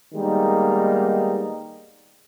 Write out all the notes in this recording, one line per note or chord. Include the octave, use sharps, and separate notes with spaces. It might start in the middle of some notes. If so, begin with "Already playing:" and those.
D#3 G3 G#3 A#3 B3 D#4